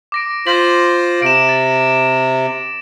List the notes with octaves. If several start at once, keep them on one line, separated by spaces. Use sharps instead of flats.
D6 A#6 D7
F4 C5 A#6 B6 F#7
C3 D7 E7
A6